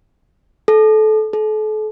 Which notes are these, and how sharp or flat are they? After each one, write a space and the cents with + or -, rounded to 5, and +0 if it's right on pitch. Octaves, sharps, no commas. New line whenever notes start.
A4 -25
A4 -40